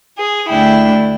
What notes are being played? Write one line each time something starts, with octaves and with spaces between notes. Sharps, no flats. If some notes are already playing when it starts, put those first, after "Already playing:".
G#4
D2 A3 D4 E4 G5